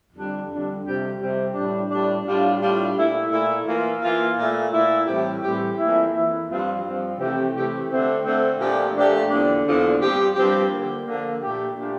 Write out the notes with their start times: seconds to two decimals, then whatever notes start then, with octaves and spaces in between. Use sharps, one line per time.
0.13 F2 D3 G3 D4
0.49 F2 D3 G3 D4
0.85 F2 C3 G3 C4 G4
1.19 F2 C3 G3 C4 G4
1.54 A2 G3 D4
1.89 A2 G3 D4
2.25 A2 G3 D4 F4
2.60 A2 G3 D4 F4
2.95 A#2 A3 E4
3.30 A#2 A3 E4
3.66 E3 A#3 F4
4.01 E3 A#3 F4
4.37 A#2 A3 E4
4.72 A#2 A3 E4
5.07 A2 E3 G3 C4 G4
5.42 A2 E3 G3 C4 G4
5.78 F2 E3 A#3 E4
6.13 F2 E3 A#3 E4
6.48 G2 F3 C4 F4
6.83 G2 F3 C4 F4
7.18 C3 E3 A3 C4 G4
7.53 C3 E3 A3 C4 G4
7.89 D3 A3 C4
8.24 D3 A3 C4
8.59 A#2 F3 A3 D4 G4
8.95 A#2 F3 A3 D4 G4
9.30 E2 D3 F3 A#3 D4
9.66 E2 D3 F3 A#3 D4
10.01 G2 F3 C4 G4
10.36 G2 F3 C4 G4
10.71 D3 F3 A#3
11.06 D3 F3 A#3
11.41 A#2 A3 D4 G4
11.77 A#2 A3 D4 G4